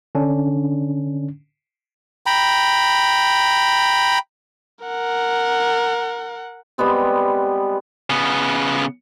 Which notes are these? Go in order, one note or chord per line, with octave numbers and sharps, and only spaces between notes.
D3 C#4 D4
G5 A#5 B5
A#4 F#5
G3 G#3 B3 C4
C#3 B3